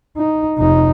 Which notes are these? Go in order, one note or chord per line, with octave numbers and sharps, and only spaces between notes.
D#4
F1 D#4